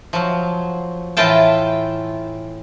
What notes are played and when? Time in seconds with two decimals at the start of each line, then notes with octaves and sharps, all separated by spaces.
0.13 F3 F#3
1.17 A2 E3 F4 G5 A5